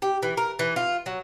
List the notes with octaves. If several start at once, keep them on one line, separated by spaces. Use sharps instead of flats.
G4
E3
A#4
E3
F4
F#3